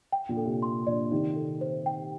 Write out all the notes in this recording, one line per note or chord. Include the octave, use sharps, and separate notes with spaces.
G5
A#2 D3
A4
C3
C6
A#2 D3 D5
C3 D#3 D#4
A4
C5
G5